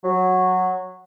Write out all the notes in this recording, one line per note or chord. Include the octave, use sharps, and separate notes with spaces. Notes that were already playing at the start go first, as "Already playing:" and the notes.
F#3